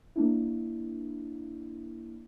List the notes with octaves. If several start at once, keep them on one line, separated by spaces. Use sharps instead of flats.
A#3 D4 E4